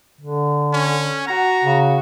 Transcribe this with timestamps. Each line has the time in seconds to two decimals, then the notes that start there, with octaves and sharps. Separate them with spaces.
0.21 D3
0.73 C#4
1.27 F#4 A#5
1.64 C#3